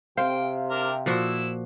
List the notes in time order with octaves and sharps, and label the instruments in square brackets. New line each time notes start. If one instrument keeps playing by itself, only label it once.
[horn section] C3 [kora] C5 [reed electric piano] F5 [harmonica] G5
[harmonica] D4 A#4
[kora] A#2 F3 F#4 [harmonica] E4